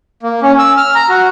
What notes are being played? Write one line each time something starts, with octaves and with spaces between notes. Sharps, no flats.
A#3
C#4
E6
F6
A#5
F#4